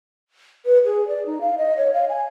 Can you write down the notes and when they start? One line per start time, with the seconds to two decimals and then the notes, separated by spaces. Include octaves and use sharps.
0.66 B4
0.85 G#4
1.08 D5
1.26 D#4
1.41 F5
1.58 D#5
1.77 C#5
1.94 F5
2.09 G#5